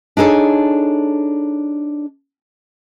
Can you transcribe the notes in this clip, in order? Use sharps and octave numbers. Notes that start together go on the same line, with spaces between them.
D4 D#4 G#4 A4 C#5